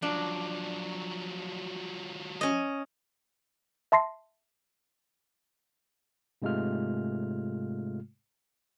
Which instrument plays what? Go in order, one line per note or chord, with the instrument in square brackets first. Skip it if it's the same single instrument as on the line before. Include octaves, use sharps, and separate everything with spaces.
[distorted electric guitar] F3 F#3 [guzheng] D4
[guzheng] C#4 D#5
[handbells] E5 A5 C6 A#6 C7
[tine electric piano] G#2 C3 G#3 A3 F4 F6